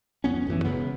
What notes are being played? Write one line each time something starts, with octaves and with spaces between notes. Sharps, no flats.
F2 B2 B3 C#4
A1 F#2 D#3 E3
E1 E2 C#3 B3